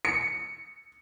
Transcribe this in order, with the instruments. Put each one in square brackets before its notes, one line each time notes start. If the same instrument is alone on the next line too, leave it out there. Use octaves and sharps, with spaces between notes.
[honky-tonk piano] C#7